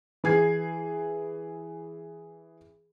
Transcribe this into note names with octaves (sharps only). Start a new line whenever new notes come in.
E3 G#4 G#6 C7